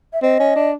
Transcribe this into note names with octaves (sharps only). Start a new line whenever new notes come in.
E5
C4 D#5
C#4
D4